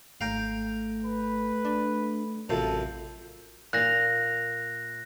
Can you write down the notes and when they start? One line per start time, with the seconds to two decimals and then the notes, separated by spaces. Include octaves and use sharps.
0.21 G#1 A3 F5 G5 A#5
1.05 B4
1.65 D4
2.50 A1 F#2 C3 F3 A4
3.73 A#2 F5 F#6 A#6